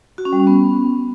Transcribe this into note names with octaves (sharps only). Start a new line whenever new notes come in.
F#4
C#4
G3
C#4
B3